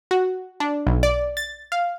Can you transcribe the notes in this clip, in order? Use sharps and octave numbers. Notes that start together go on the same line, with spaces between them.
F#4
D4
B1
D5
A6
F5